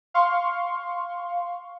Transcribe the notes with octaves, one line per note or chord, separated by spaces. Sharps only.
F5 C6 C#6